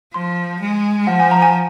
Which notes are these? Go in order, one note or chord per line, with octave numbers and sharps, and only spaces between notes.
F3 C6
G#3
F3 F#5
G#5
A#5
G#5